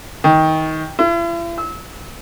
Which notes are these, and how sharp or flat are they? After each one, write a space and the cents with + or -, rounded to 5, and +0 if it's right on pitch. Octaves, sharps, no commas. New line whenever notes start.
D#3 +20
E4 +45
E6 -30